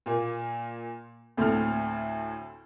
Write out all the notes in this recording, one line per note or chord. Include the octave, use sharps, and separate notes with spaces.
A#2 A#3
D2 A2 C4 A4 F6